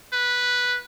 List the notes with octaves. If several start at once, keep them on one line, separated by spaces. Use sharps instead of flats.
B4